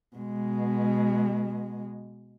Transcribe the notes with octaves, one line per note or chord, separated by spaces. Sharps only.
B2 G#3